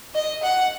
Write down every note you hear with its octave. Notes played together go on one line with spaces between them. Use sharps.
D#5
F#5